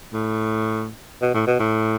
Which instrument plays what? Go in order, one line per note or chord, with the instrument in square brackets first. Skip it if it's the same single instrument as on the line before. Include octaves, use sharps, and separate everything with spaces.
[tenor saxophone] A2
B2
A2
B2
A2